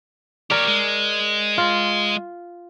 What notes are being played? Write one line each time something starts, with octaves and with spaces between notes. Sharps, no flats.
G4 A#4 C#5 D5
G#3
F4